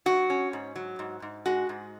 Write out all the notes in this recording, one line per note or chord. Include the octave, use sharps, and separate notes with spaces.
F#3 F#4
C#4
G#2
F#3
G#2
G#2
G#3 F#4
G#2